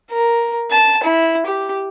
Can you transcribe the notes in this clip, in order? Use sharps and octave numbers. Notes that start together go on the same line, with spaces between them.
A#4
A5
E4
G4